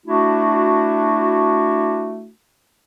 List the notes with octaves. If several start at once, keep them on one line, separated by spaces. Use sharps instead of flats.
A3 D4 E4 F#4